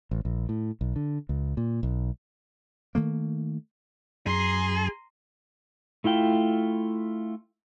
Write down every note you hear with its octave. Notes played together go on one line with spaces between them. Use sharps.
A1
A#1
A2
B1
D3
C#2
A#2
B1
D#3 A3 A#3
F#2 G#4 A#5 C6
A3 E4 F4 G5